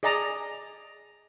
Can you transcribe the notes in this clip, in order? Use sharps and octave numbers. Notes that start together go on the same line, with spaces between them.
G#4 D5 D#5 A5 A#5